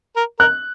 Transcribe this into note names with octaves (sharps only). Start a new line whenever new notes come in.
A#4
A#4 F#6